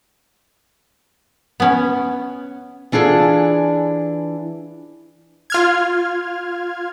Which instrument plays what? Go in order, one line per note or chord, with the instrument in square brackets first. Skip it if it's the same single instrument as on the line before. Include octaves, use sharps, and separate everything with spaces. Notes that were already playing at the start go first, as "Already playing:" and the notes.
[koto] B3 C#4
[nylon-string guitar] E3 D4 F4 G#4 A4
[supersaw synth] F4 F6 G#6